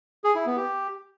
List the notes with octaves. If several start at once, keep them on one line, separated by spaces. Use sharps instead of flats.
G#4
E4
B3
G4